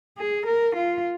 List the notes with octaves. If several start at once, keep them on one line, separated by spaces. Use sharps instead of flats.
G#4
A#4
F4